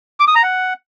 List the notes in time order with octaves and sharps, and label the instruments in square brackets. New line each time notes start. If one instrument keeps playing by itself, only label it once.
[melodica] D6
D#6
A#5
F#5